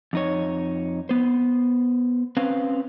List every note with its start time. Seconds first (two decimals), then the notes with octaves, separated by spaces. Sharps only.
0.13 F2 D#4 C#5
1.09 B3 C5
2.37 C4 C#4 B4 C5 F5